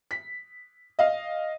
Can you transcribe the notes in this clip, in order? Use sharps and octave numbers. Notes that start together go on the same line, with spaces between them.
B6
D#5 F5